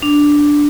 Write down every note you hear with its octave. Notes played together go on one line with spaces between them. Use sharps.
D4